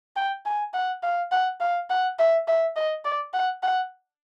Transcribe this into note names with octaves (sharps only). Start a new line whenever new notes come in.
G5
G#5
F#5
F5
F#5
F5
F#5
E5
E5
D#5
D5
F#5
F#5